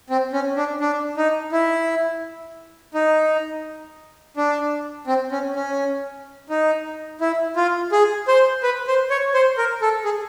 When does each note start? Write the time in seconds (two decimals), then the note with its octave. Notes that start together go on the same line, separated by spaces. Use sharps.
0.10 C4
0.33 C#4
0.57 D4
0.81 D4
1.17 D#4
1.52 E4
2.94 D#4
4.37 D4
5.07 C4
5.32 C#4
5.56 C#4
6.50 D#4
7.21 E4
7.56 F4
7.92 G#4
8.28 C5
8.63 B4
8.87 C5
9.10 C#5
9.34 C5
9.58 A#4
9.82 A4
10.04 G#4